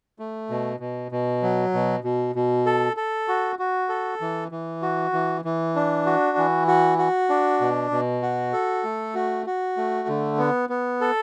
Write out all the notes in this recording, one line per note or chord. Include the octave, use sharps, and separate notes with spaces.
A3
B2
B2
B2
F#3
B2
B2
B2
A4
A4
F#4
F#4
A4
E3
E3
F#4
E3
E3
D4
F#4
E3
F#4
F#4
D4
B2
B2
F#4
A4
A3
F#4
F#4
A3
D3
B3
B3
A4